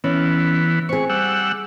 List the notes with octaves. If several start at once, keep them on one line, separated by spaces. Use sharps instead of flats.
E3 B3 C#4
C4 G#4 C#6
G3 F#5 E6